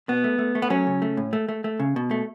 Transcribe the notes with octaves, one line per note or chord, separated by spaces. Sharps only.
B2 B3
A3
A3
A3
B3
F#3 C#4
C#3
A3
A2
A3
A3
A3
C#3
B2
A3